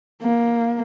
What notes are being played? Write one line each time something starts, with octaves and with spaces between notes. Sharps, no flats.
A#3